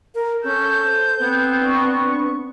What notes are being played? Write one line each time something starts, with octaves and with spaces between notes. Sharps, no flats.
A#4
C#4 A4 G6
C5
B3 C4
D4 C#6